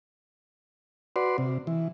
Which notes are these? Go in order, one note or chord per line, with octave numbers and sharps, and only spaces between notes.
F#4 B4 D5 C6
C3
E3